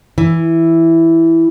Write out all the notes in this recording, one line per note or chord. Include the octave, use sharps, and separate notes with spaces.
E3